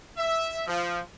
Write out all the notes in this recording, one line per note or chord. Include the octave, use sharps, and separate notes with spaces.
E5
F3